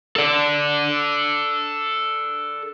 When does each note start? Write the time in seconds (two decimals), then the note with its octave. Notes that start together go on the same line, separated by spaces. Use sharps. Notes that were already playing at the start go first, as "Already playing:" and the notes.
0.16 A4 D5